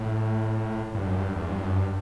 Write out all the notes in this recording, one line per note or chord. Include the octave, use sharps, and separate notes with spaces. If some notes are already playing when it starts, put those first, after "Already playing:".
Already playing: A2
G2
F#2
G2
E2
G2
F#2
G2